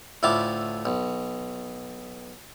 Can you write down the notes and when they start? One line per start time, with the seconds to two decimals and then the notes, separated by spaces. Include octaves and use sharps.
0.23 D2 A2 E4 F4 D6
0.85 B1